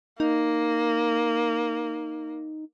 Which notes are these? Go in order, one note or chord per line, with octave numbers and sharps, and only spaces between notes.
A#3 D#4